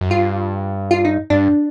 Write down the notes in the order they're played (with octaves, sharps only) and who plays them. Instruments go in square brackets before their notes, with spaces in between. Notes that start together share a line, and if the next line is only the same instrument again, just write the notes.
[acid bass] F#2
[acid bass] G2 [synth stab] F4
[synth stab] F4
D#4
[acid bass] G2 [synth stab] D4